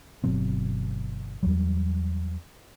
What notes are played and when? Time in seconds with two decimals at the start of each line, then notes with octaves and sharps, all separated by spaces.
0.24 G1 B2 F#3 C4
1.43 E2 F#3 G3